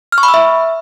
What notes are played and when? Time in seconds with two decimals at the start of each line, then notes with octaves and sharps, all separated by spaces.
0.12 F6
0.18 C#6
0.23 B5
0.28 E6
0.34 E5